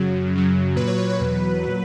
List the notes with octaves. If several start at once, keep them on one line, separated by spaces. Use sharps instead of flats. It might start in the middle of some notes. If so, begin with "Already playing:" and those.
Already playing: F#2 C#3 F#3
F#2 C#3 F#3
A#2 F#3 B4
C#5
C#5
B4
E2 B2 F#3
A#2 F#3